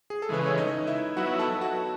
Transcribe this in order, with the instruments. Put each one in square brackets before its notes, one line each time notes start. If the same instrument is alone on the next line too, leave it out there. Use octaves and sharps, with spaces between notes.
[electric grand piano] G#4
A4
[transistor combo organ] C#3 E3 G#3 [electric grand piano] B4
[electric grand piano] C#5
D#4 D#5
E4 E5
[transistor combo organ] F#3 B3 E4 [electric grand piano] F#4 F#5
[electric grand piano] A4 A5
F#4 F#5